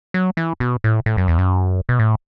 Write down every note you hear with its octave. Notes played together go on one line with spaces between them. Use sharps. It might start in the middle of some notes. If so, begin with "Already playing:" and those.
F#3
E3
B2
A2
A2
F#2
E2
F#2
B2
A2